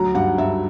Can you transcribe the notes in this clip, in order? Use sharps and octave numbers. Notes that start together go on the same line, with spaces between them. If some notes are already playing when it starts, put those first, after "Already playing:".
Already playing: D2 F#3 A#5
G2 F#5
G2 E5